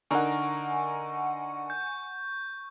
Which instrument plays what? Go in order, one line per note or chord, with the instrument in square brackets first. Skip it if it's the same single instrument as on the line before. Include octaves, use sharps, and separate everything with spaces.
[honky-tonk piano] D3 D#4 A#4 [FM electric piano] F#5 G#5 [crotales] C#6
[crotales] G6